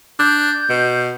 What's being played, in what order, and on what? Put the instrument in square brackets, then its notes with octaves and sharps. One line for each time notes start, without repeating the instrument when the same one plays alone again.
[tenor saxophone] D4 [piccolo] G6
[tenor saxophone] B2